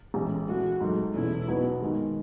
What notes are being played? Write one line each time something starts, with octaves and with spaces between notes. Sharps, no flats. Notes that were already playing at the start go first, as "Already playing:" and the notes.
A1 A2 G#3 C#4
A1 A2 G#3 F#4
G#2 F#3 A3
E1 E2 B2 A3 C#4 E4
B1 B2 F#3 B3 F#4
G#2 D#3 G#3